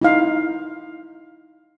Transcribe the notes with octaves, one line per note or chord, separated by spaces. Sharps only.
D#4 E4 F5